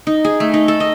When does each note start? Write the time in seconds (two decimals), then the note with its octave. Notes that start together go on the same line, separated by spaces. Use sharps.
0.07 D#4
0.25 G#4
0.40 A3
0.54 D#4
0.68 A4
0.80 D#5